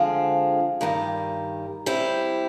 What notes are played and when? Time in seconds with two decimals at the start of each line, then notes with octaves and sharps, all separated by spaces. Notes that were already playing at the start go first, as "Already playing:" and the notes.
Already playing: D3 F3 G#3 C4 F4
0.81 G2 D#3 G3
1.86 G3 C4 E4